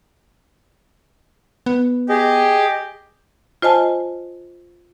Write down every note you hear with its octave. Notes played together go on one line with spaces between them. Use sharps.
B3
G4 G#4 D#5
F4 C5 D#5 G#5 A5